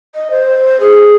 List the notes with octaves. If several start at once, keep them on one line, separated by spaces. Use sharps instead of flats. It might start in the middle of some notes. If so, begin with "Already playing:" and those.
D#5
C5
G#4